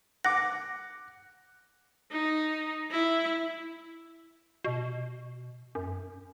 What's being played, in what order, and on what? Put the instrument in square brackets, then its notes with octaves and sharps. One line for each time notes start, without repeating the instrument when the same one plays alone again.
[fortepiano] F#5 D6 [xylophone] A#6
[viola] D#4
E4
[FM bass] B2
F#2